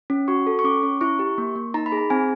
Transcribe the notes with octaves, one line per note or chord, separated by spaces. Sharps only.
C#4
F#4 C#6
A4
C#6
C#4 D6
C#4
E4 C#6
G4
A#3
A#3
D#4 A#5
B5
G#4
A#5
C4 G#5